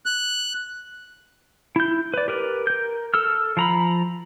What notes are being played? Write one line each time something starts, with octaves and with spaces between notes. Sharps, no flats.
F#6
E4 G6
B4 D5
G4 A#4 B4
A#4 G6
A4 E6 F6
F3 A#5 B5